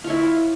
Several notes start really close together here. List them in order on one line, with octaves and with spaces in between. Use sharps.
F4 C#5 E4